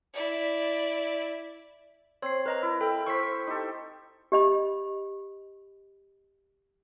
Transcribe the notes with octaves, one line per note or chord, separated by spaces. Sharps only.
E4 D5
C4 C#5 C7
A#4 B4 D#5 A#5
E4
A4 G5
E4 C5 C#6 E6 B6
D#4 G4 A4
G4 D#5 B5